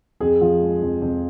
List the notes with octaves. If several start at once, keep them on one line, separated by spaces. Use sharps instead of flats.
F2 G#4
F3
G#3
F2
F2